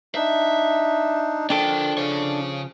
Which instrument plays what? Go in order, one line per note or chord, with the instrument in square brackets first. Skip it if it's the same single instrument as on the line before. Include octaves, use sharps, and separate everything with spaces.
[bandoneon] D4 D#4 [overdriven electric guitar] E5
[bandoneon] F3 [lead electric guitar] D4 A4 [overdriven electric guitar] A#4 G5
[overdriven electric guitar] C#3 C#5